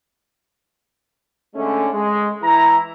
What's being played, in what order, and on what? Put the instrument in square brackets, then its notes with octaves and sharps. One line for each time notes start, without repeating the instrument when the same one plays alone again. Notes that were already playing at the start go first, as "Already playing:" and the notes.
[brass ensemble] D3 G#3 A3 C#4
G#3
E3 E4 A#5